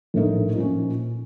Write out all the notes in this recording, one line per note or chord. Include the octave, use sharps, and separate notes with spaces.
A#1 A2 A3 D#4 A#4
A#2 F3 A#3 C#4